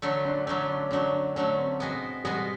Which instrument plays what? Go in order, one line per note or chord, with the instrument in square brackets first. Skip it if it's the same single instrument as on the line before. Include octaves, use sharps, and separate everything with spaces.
[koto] D3 F#3 A3
[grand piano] D4
[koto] D3 F#3 A3 [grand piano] C#4
[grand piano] D4
[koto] D3 F#3 A3 [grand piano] D4
[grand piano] D4
[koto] D3 F#3 A3 [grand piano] C#4
[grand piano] C4
[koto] B2 G#3 B3
[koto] B2 G#3 B3 [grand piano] G3